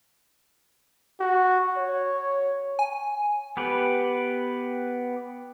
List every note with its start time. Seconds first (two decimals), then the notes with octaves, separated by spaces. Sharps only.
1.20 F#4
1.77 C#5
2.79 G#5
3.57 B3 G4 B4